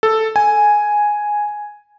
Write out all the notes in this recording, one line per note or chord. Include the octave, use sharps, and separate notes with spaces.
A4
G#5